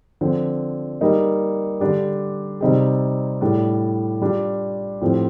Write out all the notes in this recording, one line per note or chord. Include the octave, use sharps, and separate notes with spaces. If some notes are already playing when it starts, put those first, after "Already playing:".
D3 F3 C4
G3 A#3 D#4
D3 G3 D4 G4
C3 G3 C4 D#4 G4
A2 G3 D4
G3 D4 F4
A2 F3 C4 G4